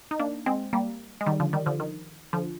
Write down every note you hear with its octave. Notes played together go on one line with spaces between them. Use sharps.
D#4
A#3 D4
G#3 C4
G3 A#3
G#3
D#3 G3
D3 F3
D#3 G3
D3 F3
D#3
D3 F3